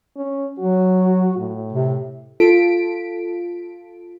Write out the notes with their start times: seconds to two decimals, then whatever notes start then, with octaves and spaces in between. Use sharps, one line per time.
0.17 C#4
0.59 F#3 F#4
1.38 A2
1.73 C3
2.40 F4 A4 B6 D7